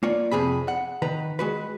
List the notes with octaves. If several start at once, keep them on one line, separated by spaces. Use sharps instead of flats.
A#3 F4 C#5 D5
F2 C3 G#4 B5
F#5
D#3 B4 A#5
G#3 F#4 B4